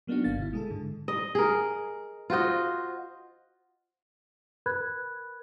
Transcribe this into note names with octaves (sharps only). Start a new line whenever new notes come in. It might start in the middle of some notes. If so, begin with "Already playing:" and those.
F#3 A#3 B3 D4 D#4 F#4
G1 D3 F5 A6
B2 E4
G#3 G#4 A4
G#2 D3
D#5
G#4 A#4
F4 F#4 C5 D#5
A#4 B4 B5 F#6 G#6